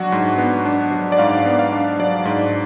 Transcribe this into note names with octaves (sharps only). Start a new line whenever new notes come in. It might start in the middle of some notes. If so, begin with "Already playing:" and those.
Already playing: F#3 D4 F#4
G#2
B3
D4
F#3
D5
G#2 F5
B3
F5
D4
F#3 D5
G#2